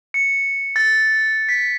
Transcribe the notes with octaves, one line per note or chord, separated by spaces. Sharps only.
C#7
A6
B6